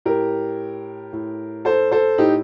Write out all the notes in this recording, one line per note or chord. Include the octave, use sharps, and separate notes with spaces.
A2 G4 A#4
A2
A4 C5
A4 C5
A2 D#4 G4